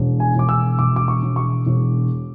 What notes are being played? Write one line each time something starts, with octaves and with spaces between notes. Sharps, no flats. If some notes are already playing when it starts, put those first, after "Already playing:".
Already playing: E1
G#5
E1 D6
E6
E1 D6
D6
C#6
E1
C#6
E1